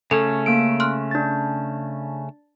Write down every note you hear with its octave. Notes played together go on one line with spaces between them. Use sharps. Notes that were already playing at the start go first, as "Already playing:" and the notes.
C#3 A3 C#4 A4
A#3 E6 D7
C6 F6 F#6
D4 A6